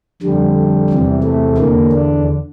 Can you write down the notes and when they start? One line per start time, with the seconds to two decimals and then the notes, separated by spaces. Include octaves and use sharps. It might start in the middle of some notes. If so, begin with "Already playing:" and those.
0.22 F2 D3 G3
0.90 E2 C3 E3
1.24 A3
1.58 E2 D3 A#3
1.92 D4